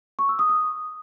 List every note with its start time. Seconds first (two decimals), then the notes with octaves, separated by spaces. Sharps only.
0.19 C#6
0.29 E6
0.39 D#6
0.49 D#6